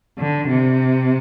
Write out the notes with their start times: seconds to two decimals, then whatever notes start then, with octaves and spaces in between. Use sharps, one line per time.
0.18 D3
0.49 C3